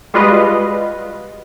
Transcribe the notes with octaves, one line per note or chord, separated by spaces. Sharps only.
G3 G#3 F4 F#4 B4 D#5